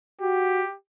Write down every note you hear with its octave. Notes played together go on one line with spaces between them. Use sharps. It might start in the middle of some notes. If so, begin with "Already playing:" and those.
F#4 G4